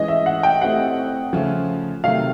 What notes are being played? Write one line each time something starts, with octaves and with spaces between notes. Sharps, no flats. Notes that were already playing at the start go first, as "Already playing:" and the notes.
Already playing: E3 G#3 C#4 D#5
E5
F#5
G5
A3 C4 E4 G4 F#5
C#3 F3 A3 C#4 F4
C3 D#3 F#3 A3 F5